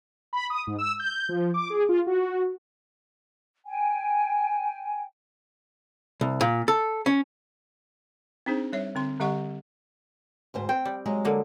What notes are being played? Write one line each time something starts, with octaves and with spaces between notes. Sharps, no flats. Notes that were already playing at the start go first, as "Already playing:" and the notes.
B5
D#6
G#2
E6
G6
F3
D6
G#4
F4
F#4
G5 G#5
C2
A#2
A4
C#4
C4 D4 D#4 G#4 C5
G3 C#5 E5
D3 C4 C6
D3 G3 G4 D#5 F#5 C#6
D2 G#2 C5
C4 G5
G3
F#3 G#3
D3 A#3